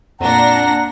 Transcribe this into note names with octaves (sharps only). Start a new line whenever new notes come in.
F2 A#2 D4 F#5 A#5 A#6